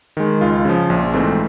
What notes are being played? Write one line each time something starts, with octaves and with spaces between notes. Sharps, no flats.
D#3 G#3
C#2 F4
C#3 F3
A#1
G#2 E3 A3 C4